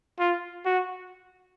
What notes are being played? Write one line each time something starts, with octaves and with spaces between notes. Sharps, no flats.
F4
F#4